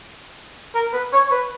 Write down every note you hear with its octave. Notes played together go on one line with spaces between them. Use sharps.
A#4
B4
C#5
C#5
B4